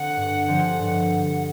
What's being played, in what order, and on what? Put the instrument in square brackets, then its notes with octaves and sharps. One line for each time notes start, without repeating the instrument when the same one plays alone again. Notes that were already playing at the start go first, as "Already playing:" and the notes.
Already playing: [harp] D3 C4 [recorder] F#5
[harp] G2
D3 F3 G#3 C4
G2